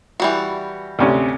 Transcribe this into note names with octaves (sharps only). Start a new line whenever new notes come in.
E3 G3 F#4
D2 C3 C#4